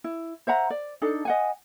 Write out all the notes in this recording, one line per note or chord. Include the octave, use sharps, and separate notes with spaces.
E4
C5 E5 F#5 A#5
D5
D4 D#4 A4
D#5 F#5 G#5